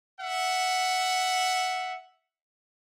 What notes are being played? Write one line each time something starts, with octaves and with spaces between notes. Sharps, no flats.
E5 F#5